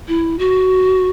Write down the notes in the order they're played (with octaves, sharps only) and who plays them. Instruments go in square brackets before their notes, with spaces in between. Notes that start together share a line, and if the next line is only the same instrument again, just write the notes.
[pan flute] E4
F#4